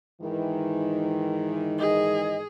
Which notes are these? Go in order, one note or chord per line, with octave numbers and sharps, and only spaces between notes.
G#2 D#3 E3
G#4 D#5